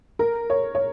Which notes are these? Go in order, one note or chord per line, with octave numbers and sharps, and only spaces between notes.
A#4
C#5
C#5